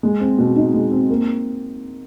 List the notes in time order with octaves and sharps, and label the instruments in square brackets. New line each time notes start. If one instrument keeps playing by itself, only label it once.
[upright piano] G#3
C4
B2
D#4
G#3
C4
A#3